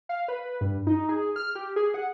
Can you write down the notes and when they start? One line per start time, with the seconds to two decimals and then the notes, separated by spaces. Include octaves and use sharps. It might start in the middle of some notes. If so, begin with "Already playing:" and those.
0.09 F5
0.28 B4
0.61 G2
0.87 D#4
1.09 G#4
1.36 F6
1.55 G4
1.76 G#4
1.94 F#5